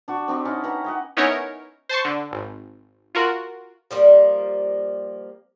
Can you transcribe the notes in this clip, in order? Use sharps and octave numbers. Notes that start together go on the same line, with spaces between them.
D4 F#4 C#6
C4 D4 G4 D#5
C#4 D#4 E4 A5
G4 B4 F#5 A#5
C#5 D#5 F#5
B3 C#4 D#4 E4 A#4 C#5
C5 A5 C6 C#6
D3
G#1
F4 F#4 A#4
F3 G3 A#3